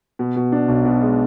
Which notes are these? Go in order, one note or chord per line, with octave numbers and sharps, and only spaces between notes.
B2
B2
D4
B1
B2
G#3